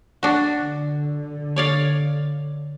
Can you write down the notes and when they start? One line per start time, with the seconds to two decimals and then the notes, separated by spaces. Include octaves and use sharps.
0.23 D4 F#4
0.57 D3
1.56 C#5 D5 F5